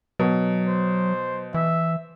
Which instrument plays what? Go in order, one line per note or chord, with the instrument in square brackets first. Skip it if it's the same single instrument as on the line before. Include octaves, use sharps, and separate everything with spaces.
[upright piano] B2 [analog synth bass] F#3
[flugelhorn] C5
[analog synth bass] E3 [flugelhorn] E5